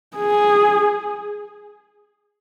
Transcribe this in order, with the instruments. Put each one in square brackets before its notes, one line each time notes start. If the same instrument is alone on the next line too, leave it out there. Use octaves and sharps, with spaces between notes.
[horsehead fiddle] G#4